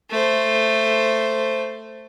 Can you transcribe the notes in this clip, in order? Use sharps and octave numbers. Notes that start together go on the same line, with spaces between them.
A3 C5